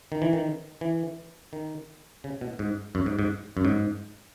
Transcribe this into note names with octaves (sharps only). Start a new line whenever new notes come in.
D#3
E3
D#3
E3
D#3
C#3
B2
G#2
F#2
G#2
G#2
F#2
G#2